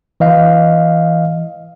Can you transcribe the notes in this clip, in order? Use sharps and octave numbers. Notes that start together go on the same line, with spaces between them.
E3 D#5 F5